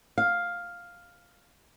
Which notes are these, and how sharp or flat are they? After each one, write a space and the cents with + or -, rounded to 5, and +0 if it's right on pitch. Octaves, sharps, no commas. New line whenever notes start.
F5 +5